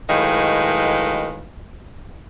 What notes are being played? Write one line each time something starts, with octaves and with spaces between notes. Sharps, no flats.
F#2 A2 D#3 G#3 B4 F5